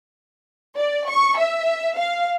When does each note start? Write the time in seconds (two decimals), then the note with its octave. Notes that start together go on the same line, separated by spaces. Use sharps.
0.78 D5
1.09 C#6
1.38 E5
1.98 F5